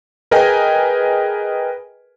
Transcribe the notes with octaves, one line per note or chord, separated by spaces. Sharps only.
G#4 A#4 B4 D#5 G5 G#5